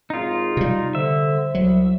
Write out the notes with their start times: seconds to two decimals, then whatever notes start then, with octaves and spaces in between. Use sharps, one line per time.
0.10 G#1 D#4 F4
0.57 C3 G3
0.95 D3 C5 E5
1.55 C2 F#3